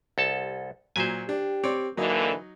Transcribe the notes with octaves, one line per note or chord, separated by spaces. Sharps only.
C2 A4 A5
A#2 F#3 C5 G#5
D4 G4
C4 C#5 D5
G#2 D3 E3 F#3 A#3 D#4